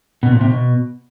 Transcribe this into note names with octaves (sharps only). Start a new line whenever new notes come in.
B2
A#2
C3
B2